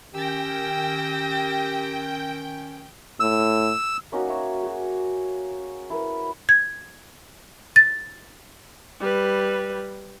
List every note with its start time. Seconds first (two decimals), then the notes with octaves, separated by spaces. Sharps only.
0.14 D#3 C#4 G4 G5 E6 A#6
3.20 A2 E6
4.12 A#3 C#4 D#4 F#4
4.28 C#5 E5
4.63 F#4 G#4
5.90 E4 A#4 B4
6.49 G#6
7.76 A6
9.00 G3 B4